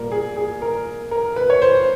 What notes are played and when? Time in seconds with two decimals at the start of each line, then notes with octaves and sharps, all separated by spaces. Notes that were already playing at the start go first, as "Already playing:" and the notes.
Already playing: A#2 G3 A#4
0.12 G#4
0.37 G#4
0.62 A#4
1.11 A#4
1.36 B4
1.50 C#5
1.62 C5